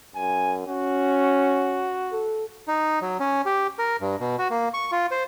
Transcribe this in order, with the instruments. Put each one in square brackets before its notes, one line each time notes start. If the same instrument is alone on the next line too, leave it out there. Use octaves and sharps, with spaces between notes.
[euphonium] F#2 [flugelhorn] G#5
[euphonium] C#4 [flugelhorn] F#4
[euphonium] A4
[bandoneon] D#4
F#3
C#4
G4
A#4
G2
B2
F#4
A#3
C#6
F4
C5